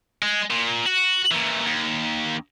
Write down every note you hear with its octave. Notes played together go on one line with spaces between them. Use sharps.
G#3
A#2
F#4
A#2 E3
D#2